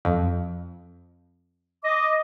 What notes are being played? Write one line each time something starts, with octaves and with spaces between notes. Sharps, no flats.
F2
D#5 D6